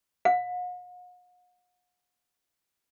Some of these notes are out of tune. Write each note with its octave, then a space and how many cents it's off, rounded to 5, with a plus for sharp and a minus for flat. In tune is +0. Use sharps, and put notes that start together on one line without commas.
F#5 -45